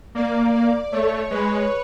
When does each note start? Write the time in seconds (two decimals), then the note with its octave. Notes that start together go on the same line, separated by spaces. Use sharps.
0.15 A#3 D5
0.54 D5
0.92 A3 C#5
1.30 G#3 B4